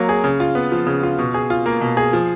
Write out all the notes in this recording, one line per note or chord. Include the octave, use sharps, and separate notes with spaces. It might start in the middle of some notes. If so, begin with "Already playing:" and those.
Already playing: F#3 A#3
G#4
C#3
F4
B3
F3
C#3
F4
B2
G#4
F4
A#3
B2
G#4
F3